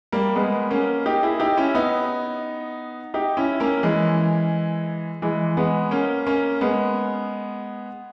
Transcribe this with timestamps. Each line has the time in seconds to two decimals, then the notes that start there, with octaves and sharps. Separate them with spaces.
0.12 G3 A#3
0.35 G#3 B3
0.71 A#3 C#4
1.06 D#4 G4
1.23 E4 G#4
1.40 D#4 G4
1.57 C#4 E4
1.75 B3 D#4
3.14 D#4 G4
3.37 C#4 E4
3.60 A#3 C#4
3.83 E3 G#3
5.22 E3 G#3
5.57 G#3 B3
5.91 A#3 C#4
6.27 A#3 C#4
6.61 G#3 B3